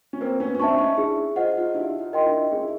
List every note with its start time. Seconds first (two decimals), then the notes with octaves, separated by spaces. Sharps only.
0.13 C#4
0.21 A#3 C4 B4
0.40 B3 C#4
0.55 C#4
0.60 C4 D4 E5 A5 C#6
0.78 C#4 D#4
0.98 D4 E4 G#4
1.36 F4 C5 D#5 F#5
1.58 D#4 F4
1.74 D4 E4 G4
2.00 D#4 F4
2.13 A#4 D#5 G5 C6
2.25 D4 E4
2.51 C#4 D#4 G#4
2.62 E4